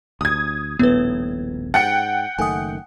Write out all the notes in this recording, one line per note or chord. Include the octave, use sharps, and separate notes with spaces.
D2 D#6 G#6
D#1 A#1 A2 B3 B4
G#2 F#5 G5 A6 C#7
F#1 D#3 A3 G#5 D#6